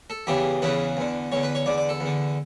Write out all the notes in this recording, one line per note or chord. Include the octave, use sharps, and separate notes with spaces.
A4
E2 C#3 E3 G4
E2 C#3 E3 B4
E2 D3
E2 D3 C#5
B4
C#5
E2 D3 D5
D5
A4
E2
D3